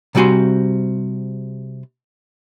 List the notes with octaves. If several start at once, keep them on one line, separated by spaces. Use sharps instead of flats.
C3 G3 C4 F#4 G#5 C6